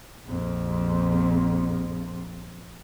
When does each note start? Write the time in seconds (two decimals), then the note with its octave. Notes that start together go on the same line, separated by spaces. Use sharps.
0.25 A#1 F2